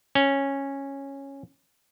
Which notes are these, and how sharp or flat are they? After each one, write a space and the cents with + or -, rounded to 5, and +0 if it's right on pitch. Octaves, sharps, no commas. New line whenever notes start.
C#4 -10